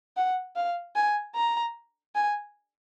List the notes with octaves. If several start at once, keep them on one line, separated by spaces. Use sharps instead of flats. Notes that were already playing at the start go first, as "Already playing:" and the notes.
F#5
F5
G#5
A#5
G#5